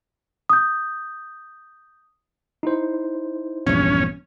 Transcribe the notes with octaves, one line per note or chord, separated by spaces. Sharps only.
D#6 G6
D#4 E4 C5
A#1 E2 G2 C#4